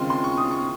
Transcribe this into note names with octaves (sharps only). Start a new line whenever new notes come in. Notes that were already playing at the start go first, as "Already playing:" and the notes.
Already playing: D#2 C#3 G#3 C4 F4 C6
C6
C#6
D#6
C#6